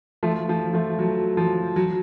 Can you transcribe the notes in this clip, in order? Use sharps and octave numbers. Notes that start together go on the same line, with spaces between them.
F3 A3
F3
F3 A3
F#3
F3
F#3